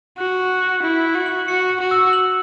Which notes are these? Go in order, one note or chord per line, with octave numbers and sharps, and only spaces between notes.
F#4 F#6
F#6
F#6
E4 F#6
F#6
F#4
F#7
F#4 C#7
C#7
F#4
E6
F#7